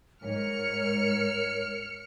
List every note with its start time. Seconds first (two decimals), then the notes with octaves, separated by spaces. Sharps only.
0.22 G#2 A#4 C#5 F6 C#7